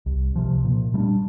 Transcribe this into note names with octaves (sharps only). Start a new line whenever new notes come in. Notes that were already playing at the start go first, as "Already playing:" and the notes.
C2
C3 F3
A#2
G3 A#3 D4